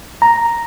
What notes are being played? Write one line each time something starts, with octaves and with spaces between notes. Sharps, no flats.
A#5